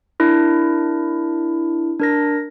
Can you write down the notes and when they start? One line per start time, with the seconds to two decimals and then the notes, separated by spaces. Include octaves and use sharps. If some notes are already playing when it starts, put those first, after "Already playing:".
0.20 D4 E4 A#4
1.99 D4 A#4 A#6